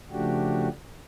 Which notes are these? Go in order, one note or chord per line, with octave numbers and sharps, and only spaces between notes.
C#3 F3 A3 D4 F#4 G4